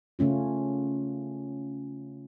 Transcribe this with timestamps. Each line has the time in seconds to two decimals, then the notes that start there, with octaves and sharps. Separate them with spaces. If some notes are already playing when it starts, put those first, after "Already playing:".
0.19 C#3 A3 C#4 F4